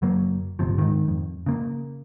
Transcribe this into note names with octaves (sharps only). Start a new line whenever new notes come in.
F#1 F#3 A#3
D1 G1 C3 F3
G#2 D#3
F2
C#3 A#3